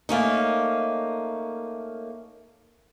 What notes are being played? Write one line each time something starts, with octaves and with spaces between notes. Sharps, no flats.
A3 A#3 C#4 D#4